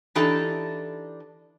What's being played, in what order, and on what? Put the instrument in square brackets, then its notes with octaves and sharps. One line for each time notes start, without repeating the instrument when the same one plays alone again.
[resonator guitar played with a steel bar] E3 D4 D#4 G4 A4